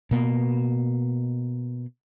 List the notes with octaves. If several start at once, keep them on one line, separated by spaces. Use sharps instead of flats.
B2 A#3